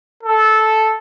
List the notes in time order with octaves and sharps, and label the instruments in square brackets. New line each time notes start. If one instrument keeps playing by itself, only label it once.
[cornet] A4